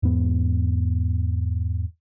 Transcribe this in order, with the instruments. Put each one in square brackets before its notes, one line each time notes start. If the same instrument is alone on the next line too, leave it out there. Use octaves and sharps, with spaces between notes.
[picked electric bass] E2 G#2 B3